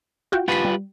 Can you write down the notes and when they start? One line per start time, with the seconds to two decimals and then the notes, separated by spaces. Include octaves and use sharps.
0.32 F4 F#4 G5
0.48 F4 G4 B4 F#5 B6
0.65 G3